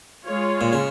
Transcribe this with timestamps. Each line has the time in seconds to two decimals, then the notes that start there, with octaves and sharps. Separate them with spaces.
0.25 G#3 F4 C#5
0.61 A#2
0.73 C#3